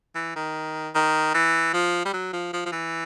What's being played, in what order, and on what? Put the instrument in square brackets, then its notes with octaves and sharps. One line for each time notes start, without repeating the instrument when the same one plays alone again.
[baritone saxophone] E3
D#3
D#3
E3
F3
G3
F#3
F3
F3
F3
E3